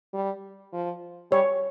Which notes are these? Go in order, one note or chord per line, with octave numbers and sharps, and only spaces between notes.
G3
F3
G3 C#5